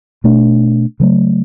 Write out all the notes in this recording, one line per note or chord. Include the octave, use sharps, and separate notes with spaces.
B2 A3 D4
C#3 F#3 A3